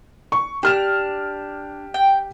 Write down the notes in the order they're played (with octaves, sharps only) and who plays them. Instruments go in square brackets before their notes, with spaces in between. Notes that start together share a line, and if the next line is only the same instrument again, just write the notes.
[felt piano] C#6
[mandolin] D4 [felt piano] G4 F6 E7
[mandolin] G5